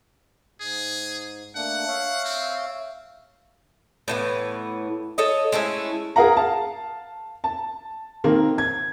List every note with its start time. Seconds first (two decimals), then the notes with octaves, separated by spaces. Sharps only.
0.60 G#2 G#4
1.55 A3 A#3 D4 F#5
1.87 C#5 E5 F5
2.25 C4
4.08 A2 E3 B3
5.18 A4 C#5 D#5
5.52 G#3 A3 C#4 E4
6.16 G#4 A#4 F5 F#5 A#5
6.37 F5 A5
7.44 A5
8.24 D#3 A#3 C4
8.58 G#6